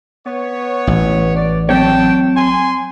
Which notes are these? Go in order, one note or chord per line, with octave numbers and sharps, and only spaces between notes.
B3 C#5
A1
D5
F#3 C4 C#5 G5 A5
G#5 C6